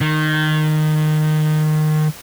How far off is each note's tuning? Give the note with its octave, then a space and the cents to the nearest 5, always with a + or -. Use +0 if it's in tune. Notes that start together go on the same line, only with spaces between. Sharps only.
D#3 -15